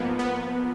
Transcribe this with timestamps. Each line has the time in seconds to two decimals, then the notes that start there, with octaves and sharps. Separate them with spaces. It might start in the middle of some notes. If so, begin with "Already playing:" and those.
Already playing: G#2 F3 A#3 B3
0.19 B3